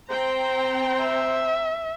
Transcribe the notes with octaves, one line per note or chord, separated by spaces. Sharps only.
C4 C5 G5 A#5
E5